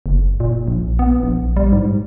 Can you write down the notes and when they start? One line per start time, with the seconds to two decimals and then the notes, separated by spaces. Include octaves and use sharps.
0.06 F#1
0.40 A#2
0.68 A#1
0.99 B3
1.23 A#1
1.57 G3
1.72 G#2